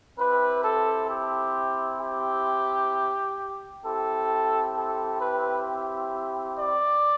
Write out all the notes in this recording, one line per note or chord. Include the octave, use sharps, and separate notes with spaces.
C4 E4 G4 B4
A4
G4
G4
C4 E4 G4 A4
A4
B4
D5